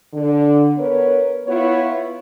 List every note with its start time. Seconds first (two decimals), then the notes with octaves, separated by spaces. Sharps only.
0.13 D3
0.77 B3 A#4 B4 C#5
1.47 B3 E4 F4 C#5